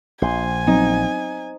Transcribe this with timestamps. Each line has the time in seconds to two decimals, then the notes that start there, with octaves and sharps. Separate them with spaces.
0.22 A#1 C5 G#5
0.67 F#3 B3 C4 D#4